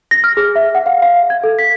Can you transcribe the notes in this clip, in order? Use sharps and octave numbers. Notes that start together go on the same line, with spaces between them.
A#6
F6
G#4
E5
F#5
F5
F5
G#6
A4
B6